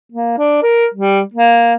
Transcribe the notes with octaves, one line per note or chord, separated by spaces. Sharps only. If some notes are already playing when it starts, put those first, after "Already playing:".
A#3
D4
A#4
G3
A#3